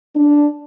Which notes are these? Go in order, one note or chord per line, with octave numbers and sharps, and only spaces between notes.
D4